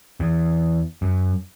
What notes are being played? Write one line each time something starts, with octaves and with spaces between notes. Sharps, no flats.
E2
F#2